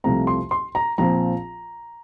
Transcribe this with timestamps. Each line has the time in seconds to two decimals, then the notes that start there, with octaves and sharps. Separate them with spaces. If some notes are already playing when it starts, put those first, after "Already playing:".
0.04 C2 C3 F3 A3 C4 A#5
0.27 C6
0.51 C6
0.75 A#5
0.98 A#1 A#2 F3 C4 A#5